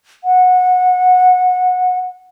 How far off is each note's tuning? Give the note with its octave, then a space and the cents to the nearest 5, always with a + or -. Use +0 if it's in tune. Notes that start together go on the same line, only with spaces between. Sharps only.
F#5 -20